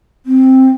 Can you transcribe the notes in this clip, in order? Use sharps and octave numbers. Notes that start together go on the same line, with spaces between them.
C4